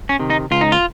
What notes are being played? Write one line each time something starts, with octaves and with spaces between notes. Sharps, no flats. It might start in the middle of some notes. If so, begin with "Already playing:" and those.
C#4
C3 D#3
D#4
C#2 F4
D#4
F4